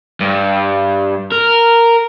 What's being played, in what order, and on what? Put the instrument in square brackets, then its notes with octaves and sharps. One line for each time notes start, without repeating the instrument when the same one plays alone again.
[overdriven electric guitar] G2
A#4